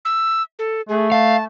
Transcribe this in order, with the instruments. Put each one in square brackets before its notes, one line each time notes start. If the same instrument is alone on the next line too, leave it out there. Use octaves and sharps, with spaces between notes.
[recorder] E6
A4
[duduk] A3 [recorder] G#4
[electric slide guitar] F5 [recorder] A5